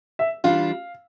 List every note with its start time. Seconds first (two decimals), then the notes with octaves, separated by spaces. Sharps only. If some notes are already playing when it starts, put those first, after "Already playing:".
0.19 E5
0.44 E3 G3 D4 F4 F5